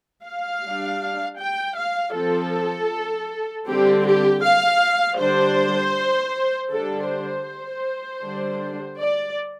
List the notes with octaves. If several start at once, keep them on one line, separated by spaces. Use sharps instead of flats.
F5
G3 D4
G5
F5
F3 C4 A4
D3 G3 C4 G4
G4
F5
D3 G3 D4 C5
D3 G3 D4 A4
C5
D3 G3 D4
D5